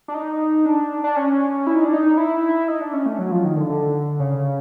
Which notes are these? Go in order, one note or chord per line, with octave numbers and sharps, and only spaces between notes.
D4
D#4
D4
D4
C#4
E4
D#4
D4
D#4
E4
D#4
D4
C#4
A3
F#3
F3
D#3
D3
D3
C#3